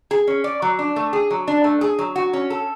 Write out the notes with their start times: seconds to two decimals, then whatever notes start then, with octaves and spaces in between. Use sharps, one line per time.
0.11 G#4
0.27 C#4
0.44 D5
0.62 F#3
0.79 D4
0.96 A3
1.13 G#4
1.31 F#3
1.48 D4
1.64 A3
1.81 G#4
1.99 F#3
2.16 F#4
2.33 C#4
2.50 A4